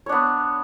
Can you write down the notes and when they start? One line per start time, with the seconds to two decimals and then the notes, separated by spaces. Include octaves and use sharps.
0.06 C#5
0.09 D4
0.12 B3